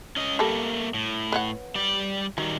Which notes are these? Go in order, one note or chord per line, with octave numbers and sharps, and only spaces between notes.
C#4 D#5
G3 A3 A#3 A4
A2
B4 C#5 F#5
G3 D5
D#3 F#3 G3